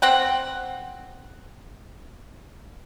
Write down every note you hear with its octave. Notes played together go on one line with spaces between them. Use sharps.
C4 F#5 G5